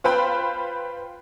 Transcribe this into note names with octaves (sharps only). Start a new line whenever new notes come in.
F4 B4 C5 G5 B5